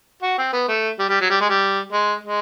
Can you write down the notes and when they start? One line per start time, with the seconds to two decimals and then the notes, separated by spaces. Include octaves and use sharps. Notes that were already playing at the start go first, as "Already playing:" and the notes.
0.23 F#4
0.38 C4
0.53 B3
0.68 A3
0.99 G3
1.09 G3
1.21 F#3
1.30 G3
1.40 G#3
1.49 G3
1.92 G#3
2.23 G#3